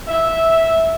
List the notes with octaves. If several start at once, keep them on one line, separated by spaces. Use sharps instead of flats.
E5